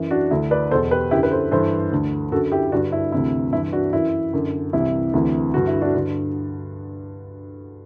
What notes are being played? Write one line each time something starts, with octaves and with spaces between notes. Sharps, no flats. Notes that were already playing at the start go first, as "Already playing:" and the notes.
Already playing: F#2 E3
D4 F#4
D2 D3 E4
B4 D5
E2 B2 A4 C5
G4 B4
F#2 D3 E4 G4
B4
A4 C5
G2 E3 A4 C5
D2 D3
F#2 D3 F#4 A4
E4 G4
G2 D3 D4 F#4
E4
D2 C3 E3 E4
G2 E3 E4
D4 F#4
F#2 E3 E4
F#2 D3
C2 C3 E3 E4
D2 C3 E3
G2 D3 F#4
E4
D4 F#4
G2 D3